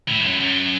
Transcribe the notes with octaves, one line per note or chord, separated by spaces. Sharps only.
A2
G2
F#2
F#2